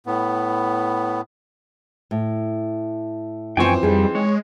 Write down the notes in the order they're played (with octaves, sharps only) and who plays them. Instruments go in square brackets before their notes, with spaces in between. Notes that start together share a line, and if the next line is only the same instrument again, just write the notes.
[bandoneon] A2 B3
[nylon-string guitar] A2
[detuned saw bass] F#2 [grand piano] E3 F3 C4 [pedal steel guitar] G5 G#5 C#6
[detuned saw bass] F2 [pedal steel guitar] G3 [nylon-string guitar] D#4 G#4
[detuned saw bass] G#3 [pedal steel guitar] C#5